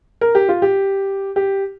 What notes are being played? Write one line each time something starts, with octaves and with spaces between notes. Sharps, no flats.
A#4
G4
F4
G4
G4